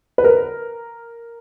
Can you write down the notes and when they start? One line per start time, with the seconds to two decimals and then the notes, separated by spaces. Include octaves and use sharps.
0.18 B4
0.24 A#4